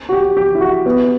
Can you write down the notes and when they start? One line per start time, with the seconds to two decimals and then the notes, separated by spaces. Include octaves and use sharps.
0.09 F#4
0.13 G4
0.37 G4
0.55 E4
0.61 F#4
0.86 B3